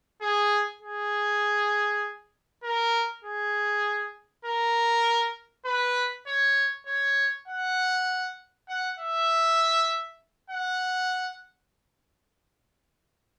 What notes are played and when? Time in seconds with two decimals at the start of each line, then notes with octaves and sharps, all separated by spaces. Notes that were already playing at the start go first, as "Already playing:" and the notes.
0.22 G#4
0.82 G#4
2.64 A#4
3.24 G#4
4.45 A#4
5.65 B4
6.27 C#5
6.87 C#5
7.48 F#5
8.69 F#5
8.99 E5
10.50 F#5